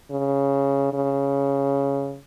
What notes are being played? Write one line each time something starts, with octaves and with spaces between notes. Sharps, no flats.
C#3
C#3